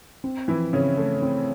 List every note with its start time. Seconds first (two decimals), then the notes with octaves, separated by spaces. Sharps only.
0.24 C4
0.48 E3 F3 E4
0.73 C#3 C4 C#4
0.97 A3 C4
1.22 C4